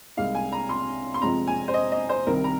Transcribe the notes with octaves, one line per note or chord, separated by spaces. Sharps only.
C2 C3 G#3 D#4 F5
G#5
A#5
C6
C6
F2 C3 F3 G#3 C4 A#5
G#5
C5
D#5
D#5
C5
C2 C3 D#3 A#4
A#5